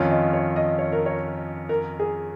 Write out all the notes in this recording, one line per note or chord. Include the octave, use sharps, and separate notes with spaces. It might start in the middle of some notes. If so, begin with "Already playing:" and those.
Already playing: F2 D#3 C#4 F4 C#5
D#5
C#5
D#5
C#5
A#4
C#5
A#4
G#4